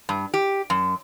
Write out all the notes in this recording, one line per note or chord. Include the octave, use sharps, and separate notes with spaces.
G2
G4
F#2